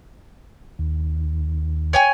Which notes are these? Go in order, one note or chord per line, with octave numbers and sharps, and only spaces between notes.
D#2
C#5 G5 G#5